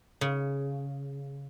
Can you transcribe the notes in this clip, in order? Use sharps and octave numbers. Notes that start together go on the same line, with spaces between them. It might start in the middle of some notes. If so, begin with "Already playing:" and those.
C#3